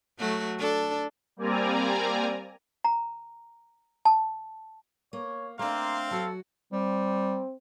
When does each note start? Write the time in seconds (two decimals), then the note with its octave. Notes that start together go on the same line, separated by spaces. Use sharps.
0.19 F#3 A3 F#4
0.58 D4 A4
1.37 G3 A#3 C4 D5 G#5 A#5
2.84 A#5
4.05 A5
5.13 A#3 C#5
5.59 A3 A#3 C4 D4 F5 C6
6.11 F#3 F#4 A4
6.72 G3 C4